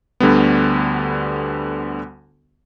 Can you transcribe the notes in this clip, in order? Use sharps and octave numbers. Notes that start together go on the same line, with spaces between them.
D2 D3 G3 B3